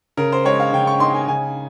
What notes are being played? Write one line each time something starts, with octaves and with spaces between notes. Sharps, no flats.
C#3 A#4
C5
G#3 C#5
F5
C#3 G5
C#6
D#4 C6
G#5
C#3 G#5